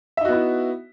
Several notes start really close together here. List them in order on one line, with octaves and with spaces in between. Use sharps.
E5 D#4 F#4 B3 E4